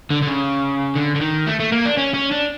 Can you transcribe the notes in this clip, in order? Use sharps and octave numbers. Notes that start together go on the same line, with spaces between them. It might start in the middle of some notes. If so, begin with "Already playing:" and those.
D3
D3
C#3
D3
D3
D#3
A3
A3
A#3
D4
C#4
C#4
D4